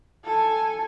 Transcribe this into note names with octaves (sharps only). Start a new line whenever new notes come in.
A4 G#5